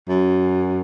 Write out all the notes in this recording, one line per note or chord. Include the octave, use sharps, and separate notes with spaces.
F#2